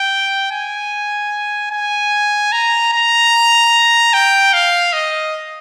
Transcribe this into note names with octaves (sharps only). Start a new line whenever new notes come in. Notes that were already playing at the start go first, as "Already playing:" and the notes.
Already playing: G5
G#5
G#5
A#5
A#5
G5
F5
D#5